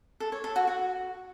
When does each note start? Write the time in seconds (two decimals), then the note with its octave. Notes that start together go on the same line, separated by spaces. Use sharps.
0.20 A4
0.32 C#5
0.44 A4
0.56 F#4
0.67 F#4